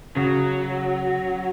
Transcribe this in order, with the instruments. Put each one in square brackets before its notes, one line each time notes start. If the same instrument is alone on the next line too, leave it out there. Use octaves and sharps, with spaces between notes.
[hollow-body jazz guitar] C#3 [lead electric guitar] F#3